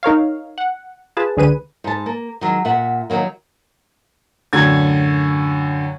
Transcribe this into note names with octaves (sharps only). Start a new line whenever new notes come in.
D#4 A#4 C#5 F5
F#5
F4 G#4 B4 A5
C#2 D3 G#4 B4 D#7
G#2 A5
A#3
D#3 F#3 G#3
A#2 E5 F#5
D#3 E3 F#3 A#3
F#2 A2 D3 G#6